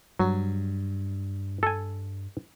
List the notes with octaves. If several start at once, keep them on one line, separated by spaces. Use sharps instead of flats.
G2 F#3
A4 G#5